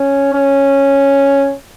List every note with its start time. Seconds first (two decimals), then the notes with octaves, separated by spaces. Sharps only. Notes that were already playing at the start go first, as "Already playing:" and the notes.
Already playing: C#4
0.34 C#4